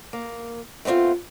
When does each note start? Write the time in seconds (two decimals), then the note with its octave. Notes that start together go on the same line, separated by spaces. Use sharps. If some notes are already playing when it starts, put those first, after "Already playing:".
0.13 A#3
0.85 A3 B3 C4 D4 F4